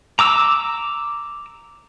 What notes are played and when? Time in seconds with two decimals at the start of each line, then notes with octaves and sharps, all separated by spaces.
0.19 A#5 D6 E6